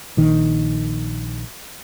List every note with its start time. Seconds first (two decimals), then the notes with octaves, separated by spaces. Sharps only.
0.17 A#1 D#3